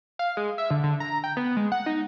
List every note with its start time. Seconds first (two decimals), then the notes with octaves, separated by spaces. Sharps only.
0.19 F5
0.37 G#3
0.58 E5
0.70 D3
0.83 D3
1.00 A#5
1.24 G5
1.37 B3
1.57 G#3
1.72 F#5
1.86 D#4